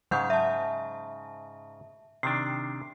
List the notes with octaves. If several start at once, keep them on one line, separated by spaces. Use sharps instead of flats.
G#2 C#3 F#3 F#5 G6
E5 A5
C3 D#3 D4 C7